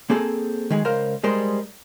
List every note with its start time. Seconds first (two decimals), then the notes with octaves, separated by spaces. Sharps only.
0.10 A#3 C4 G#4 A4
0.70 D#3 G#3 G#4
0.85 C#2 A#4 C5 F5
1.24 G3 G#3 G#4 A#4 C5